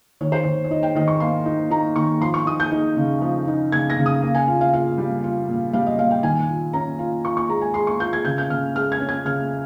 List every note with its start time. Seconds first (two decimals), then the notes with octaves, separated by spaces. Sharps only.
0.21 D#3 C#5
0.32 C5
0.44 D#3 C#5
0.64 C#5
0.71 D#4 D#5
0.83 G5
0.95 D#3 D#5
1.08 C#6
1.20 A#3 C6
1.46 D#4
1.71 D#4 A#5
1.96 D#3 C#6
2.21 F3 C6
2.34 C#6
2.46 D#4 D#6
2.60 G6
2.72 D#4
2.97 C#3
3.22 F3
3.48 D#4
3.72 C#3 G#6
3.90 A#6
3.98 C#3
4.06 D#6
4.22 A#3
4.35 G#5
4.48 F4
4.61 F5
4.73 F4 F5
4.98 G3
5.24 F4
5.48 A#2
5.73 G3 F5
5.86 D#5
5.98 A#2 F5
6.11 G5
6.23 D#3 G#5
6.49 F4
6.73 C#4 A#5
6.99 F4
7.24 F4 C#6
7.37 C#6
7.49 G#3 A#5
7.61 G#5
7.74 G#3 C6
7.87 C#6
8.00 F4 G6
8.13 G#6
8.25 C#3 G6
8.38 G6
8.49 C#3 F6
8.75 G#3 F6
8.92 G#6
9.00 C#4
9.09 G#6
9.25 C#3 F6